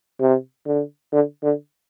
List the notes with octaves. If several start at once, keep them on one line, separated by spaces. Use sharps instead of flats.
C3
D3
D3
D3